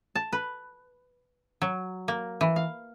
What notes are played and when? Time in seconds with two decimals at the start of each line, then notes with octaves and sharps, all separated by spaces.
0.15 A5
0.33 B4
1.62 F#3
2.08 A#3
2.41 E3
2.56 F5